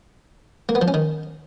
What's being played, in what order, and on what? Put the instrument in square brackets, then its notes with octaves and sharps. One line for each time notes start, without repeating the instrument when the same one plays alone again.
[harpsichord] A#3
B3
F3
C#4
D#3